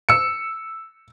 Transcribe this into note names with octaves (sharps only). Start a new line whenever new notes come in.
E6 C#7